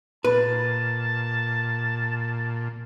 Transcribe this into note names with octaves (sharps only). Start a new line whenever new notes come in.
A#2 B4 A5